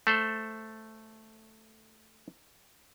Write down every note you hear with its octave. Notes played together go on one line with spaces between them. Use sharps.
A3 A4 C5